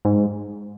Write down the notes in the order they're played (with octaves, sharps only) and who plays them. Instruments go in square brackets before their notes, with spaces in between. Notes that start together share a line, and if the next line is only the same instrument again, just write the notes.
[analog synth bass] G#2